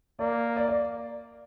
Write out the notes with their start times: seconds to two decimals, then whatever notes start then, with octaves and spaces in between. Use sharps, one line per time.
0.19 A#3 D5
0.56 D5
0.68 D5